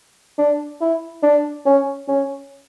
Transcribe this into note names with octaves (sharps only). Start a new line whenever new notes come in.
D4
E4
D4
C#4
C#4